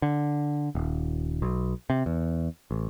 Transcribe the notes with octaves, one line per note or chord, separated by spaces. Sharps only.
D3
D#1
B1
C3
E2
A1